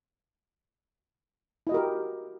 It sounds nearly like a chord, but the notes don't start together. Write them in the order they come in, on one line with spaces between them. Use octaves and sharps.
E4 D#5 F#4 A#4 G4